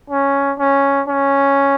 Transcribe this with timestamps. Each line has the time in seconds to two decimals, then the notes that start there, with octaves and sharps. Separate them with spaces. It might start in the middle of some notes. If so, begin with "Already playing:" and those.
0.10 C#4
0.58 C#4
1.08 C#4